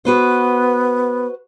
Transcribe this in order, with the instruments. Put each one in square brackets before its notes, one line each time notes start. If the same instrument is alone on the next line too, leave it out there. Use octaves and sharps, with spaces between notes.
[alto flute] B3 [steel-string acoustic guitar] F#4 B4 C5